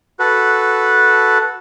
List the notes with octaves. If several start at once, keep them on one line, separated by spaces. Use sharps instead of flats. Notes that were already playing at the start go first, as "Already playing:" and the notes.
F#4 A4 B4